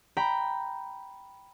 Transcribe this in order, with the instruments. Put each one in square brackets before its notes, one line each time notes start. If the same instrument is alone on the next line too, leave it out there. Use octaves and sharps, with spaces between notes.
[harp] G5 A#5 B5